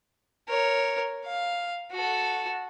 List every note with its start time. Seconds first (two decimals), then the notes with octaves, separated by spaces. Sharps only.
0.49 A#4 C#5
1.26 F5
1.92 F#4 A4